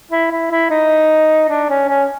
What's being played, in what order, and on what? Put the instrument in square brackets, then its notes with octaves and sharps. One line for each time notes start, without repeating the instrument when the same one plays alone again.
[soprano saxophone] E4
E4
E4
D#4
D4
C#4
C#4